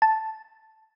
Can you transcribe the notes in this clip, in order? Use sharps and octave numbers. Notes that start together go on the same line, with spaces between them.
A5